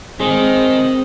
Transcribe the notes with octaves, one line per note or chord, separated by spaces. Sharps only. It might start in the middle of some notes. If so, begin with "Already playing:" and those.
D#3 G#3 C4